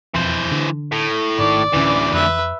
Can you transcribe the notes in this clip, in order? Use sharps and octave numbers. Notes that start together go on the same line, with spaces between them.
E1 F2 E3 C5
D3
A2
G#1 D#3 D5
D1 D2 D3 E3 C#4
F2 B4 E5